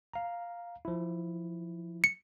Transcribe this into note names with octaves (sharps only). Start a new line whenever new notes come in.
F5 A#5
F3 E4
C#7